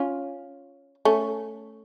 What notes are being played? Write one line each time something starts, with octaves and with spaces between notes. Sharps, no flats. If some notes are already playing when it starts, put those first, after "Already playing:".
Already playing: C#4 F4
A3 C#4